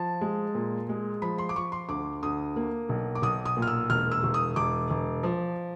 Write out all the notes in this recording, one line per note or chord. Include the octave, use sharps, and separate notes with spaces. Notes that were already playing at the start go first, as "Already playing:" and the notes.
Already playing: F3 A5
G#3
A#2
G#3
F3 B5
C6
D6
F3 C#6
C6
D2 D6
D2 D#6
A#3
B1
D6
B1 D#6
D#6
A#2
F6
E6
E1 F6
E6
E1
D#6
E1 D6
E1
F3